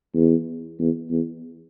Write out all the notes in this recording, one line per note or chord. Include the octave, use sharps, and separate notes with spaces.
E2
E2
E2